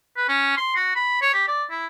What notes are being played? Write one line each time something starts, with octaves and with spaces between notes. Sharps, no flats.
B4
C#4
C6
F#4
B5
C#5
G4
D5
E4